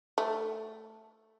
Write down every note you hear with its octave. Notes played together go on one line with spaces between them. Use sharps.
A3